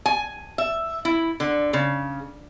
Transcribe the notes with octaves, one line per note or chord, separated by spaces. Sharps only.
G#5
E5
E4
D3
C#3